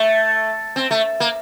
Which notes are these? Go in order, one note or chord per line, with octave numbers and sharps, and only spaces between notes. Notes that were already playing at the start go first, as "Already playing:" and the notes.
Already playing: A3
C4
A3
A#3